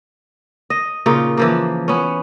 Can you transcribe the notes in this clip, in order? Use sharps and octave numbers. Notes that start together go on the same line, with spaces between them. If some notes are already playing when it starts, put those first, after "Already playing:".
D#5
A#2 C#3 D#4 F4
E3 F3 A#3
B3 C#4